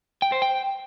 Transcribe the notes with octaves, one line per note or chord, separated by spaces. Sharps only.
G5
C5
G5